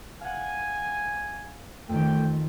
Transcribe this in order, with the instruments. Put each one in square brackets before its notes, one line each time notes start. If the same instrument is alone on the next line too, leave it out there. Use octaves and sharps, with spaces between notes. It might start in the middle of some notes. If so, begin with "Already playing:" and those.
[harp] F5 F#5 [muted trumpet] G#5
[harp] F2 D#3 [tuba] A3 [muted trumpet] G5